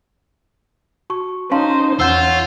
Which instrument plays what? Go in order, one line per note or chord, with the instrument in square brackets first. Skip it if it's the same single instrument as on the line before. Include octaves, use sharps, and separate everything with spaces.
[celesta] F#4 A5 C#6
[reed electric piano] C#4 [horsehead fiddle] D#4 C5 [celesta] F5 A5 C6
[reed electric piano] E2 F#5 [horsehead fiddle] C#4 [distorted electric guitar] F4 [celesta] E6 G6 E7